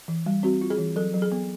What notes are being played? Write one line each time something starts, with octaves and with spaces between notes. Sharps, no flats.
E3
G3
C4 F#4
F4
G#4
E3
F#3 A4
F#3
G#4
B3